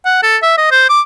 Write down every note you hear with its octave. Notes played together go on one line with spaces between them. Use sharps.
F#5
A4
E5
D#5
C5
D6